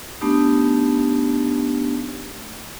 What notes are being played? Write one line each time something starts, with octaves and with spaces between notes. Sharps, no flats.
A3 B3 D4 D#4 G4